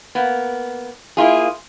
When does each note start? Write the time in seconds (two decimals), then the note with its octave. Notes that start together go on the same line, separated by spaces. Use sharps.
0.15 A#3 B3
1.17 A#3 E4 F4 G#4